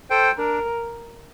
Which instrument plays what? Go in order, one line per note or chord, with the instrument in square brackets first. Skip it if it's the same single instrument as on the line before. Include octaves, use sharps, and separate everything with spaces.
[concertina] A4 C5 G5
[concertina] D4 [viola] A#4